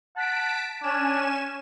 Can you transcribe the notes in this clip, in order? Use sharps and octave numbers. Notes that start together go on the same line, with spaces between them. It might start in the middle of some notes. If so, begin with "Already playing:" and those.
F#5 A5 B6 D7
C#4 D4 G#5 E7